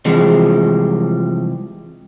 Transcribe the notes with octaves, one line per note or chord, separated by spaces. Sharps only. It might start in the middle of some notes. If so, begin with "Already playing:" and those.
C3 E3 F3 G3 G#3